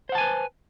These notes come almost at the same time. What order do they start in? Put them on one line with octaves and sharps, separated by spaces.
C5 F#5 A5 G#5 B4